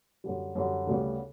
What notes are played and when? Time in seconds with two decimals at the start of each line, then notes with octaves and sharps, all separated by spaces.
0.24 F#2 D3 G3
0.55 F#2 D3 G3
0.87 D2 C#3 G3 B3